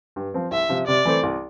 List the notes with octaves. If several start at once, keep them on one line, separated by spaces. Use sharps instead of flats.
G2
F3 C4
C2 E5
C3 F3
C3 D5
E3 A3 C4
C2